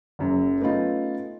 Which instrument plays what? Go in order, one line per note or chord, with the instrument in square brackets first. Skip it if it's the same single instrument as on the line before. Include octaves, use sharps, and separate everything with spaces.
[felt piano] F#1 F#2 F#3
A3 B3 C#4 D#4 F4